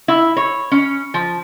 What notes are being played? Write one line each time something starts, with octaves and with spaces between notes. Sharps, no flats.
E4
C#5
C#4
F3